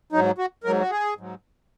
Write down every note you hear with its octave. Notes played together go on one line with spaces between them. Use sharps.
G#2 F#3 D#4
F#4
G#2 F#3 A#4
F#4
G#4
G#2 F#3